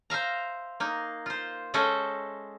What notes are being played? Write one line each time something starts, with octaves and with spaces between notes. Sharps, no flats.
C5 E5 F5 A#5
A#3 D#4
F4 C5
G#3 C#4 A4 C5 D#5 E5